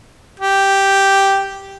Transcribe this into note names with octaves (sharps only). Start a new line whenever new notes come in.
G4